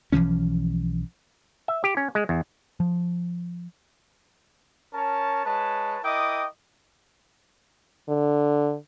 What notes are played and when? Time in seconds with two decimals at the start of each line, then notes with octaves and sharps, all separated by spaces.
0.12 B1 E3 F3 C#4
1.68 E5
1.84 G4
1.97 C#4
2.15 G#3
2.29 E2
2.80 F3
4.94 C#4 A#4 C#5 A5
5.46 G#3 B4 C#5 A5
6.04 E4 A#4 D#5 G5 D6 D#6
8.09 D3